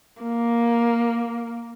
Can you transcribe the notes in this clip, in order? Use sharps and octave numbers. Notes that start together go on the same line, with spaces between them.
A#3